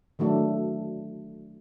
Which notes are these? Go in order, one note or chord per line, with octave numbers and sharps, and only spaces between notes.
D#3 F#3 A3 D4